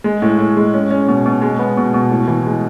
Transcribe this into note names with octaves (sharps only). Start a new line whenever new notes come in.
G#3
A2
A2
G#3
C#4
C#4
B2
B2
G#3
B3
B2
B2
A2
E3
G#3